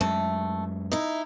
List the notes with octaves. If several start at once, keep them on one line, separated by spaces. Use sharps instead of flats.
F#2 G#3 A3
D#4 E4